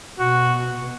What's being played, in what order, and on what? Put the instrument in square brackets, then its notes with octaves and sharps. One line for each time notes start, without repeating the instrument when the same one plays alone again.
[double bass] B2 [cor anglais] F#4